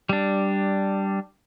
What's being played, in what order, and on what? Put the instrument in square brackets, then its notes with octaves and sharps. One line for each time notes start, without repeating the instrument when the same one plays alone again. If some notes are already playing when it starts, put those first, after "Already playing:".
[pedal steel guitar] G3 D4